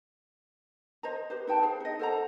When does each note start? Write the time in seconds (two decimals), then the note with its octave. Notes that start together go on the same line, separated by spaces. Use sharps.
1.03 C5 D#5 A#5
1.30 G4 B4 C5
1.47 D#4 B4 G5 A5
1.61 G#4 C5 F5
1.80 D#4 D#5
1.99 A4 C5 F#5 A#5